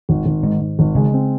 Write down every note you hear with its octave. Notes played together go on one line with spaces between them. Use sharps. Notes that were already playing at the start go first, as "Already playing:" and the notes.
G#1
G#1
G#2 D#3
G#2
G#1
C#3 G#3
C4